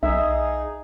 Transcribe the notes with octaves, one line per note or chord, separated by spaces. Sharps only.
B1 D#4 G#4 E5